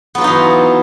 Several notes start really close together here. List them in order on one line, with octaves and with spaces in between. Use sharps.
B3 F#3 F4 D#4 E3